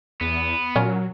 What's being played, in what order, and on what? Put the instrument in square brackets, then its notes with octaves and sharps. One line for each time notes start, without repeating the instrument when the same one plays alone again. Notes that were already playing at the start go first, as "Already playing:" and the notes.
[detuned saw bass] E2 [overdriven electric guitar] B3
[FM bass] A#2 [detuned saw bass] F#3 [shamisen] C#4 F4 A#4